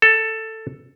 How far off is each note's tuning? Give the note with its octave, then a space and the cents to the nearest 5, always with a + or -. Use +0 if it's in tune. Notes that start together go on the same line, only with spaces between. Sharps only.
A4 +10